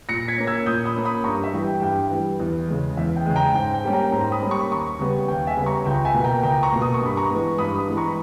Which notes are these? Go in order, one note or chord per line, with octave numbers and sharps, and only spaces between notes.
A#2 A#6 C#7
G#6 B6
A#3 C#4
E6 G#6
A#2 D#6 G6
B5 D#6
A#3 C#4
B5 D#6
G2 A#5 C#6
E5
E3 G3
G5
G2 G5
E3 G3
E2
C#3 G#3
E2 E5
G5
C#3 G#3
G5 A#5
G#2 G5
G5
G3 A#3 C#4
G5 A#5
G#2 G5 A#5
B5 D#6
G3 A#3 C#4
C#6
B5
D#2 A#5 C#6
C#3 G3 B3
D#2 G5
E5 G#5
C#3 G3 B3
A#5 C#6
C#2 G5 A#5
E5 G#5
B2 A#3
G5 A#5
C#2 G5 A#5
A#5 C#6
B2 A#3
D#6
C#6
G2 B5
A#5 C#6
E3 G#3 B3
G2 B5 D#6
B5 D#6
E3 G#3 B3
A#5 C#6
B5